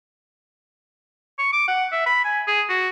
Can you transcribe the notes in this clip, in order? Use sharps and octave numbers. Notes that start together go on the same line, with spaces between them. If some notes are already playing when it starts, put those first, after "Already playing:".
C#6
D6
F#5
E5
B5
G#5
G#4
F#4